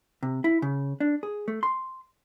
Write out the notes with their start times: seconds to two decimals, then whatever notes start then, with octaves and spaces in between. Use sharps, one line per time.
0.23 C3
0.44 E4
0.62 C#3
1.00 D4
1.23 G#4
1.48 A3
1.63 C6